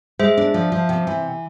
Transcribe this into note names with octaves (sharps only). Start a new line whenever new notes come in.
G#3 C5 E5
D4
F3
F3
C3
E3